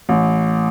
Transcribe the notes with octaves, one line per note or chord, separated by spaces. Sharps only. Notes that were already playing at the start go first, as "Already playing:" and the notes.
A1